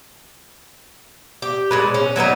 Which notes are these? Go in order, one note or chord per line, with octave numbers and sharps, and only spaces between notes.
G4
A#2 G#3 B4
C#4
F#3 A#3 B3 D#4